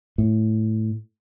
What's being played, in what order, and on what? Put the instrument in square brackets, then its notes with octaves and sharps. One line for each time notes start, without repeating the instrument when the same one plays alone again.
[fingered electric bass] A2